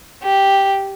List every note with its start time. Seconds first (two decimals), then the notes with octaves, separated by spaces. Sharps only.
0.23 G4